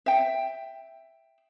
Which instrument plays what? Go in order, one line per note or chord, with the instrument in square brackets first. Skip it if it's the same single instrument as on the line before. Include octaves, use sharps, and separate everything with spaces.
[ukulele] E5 G5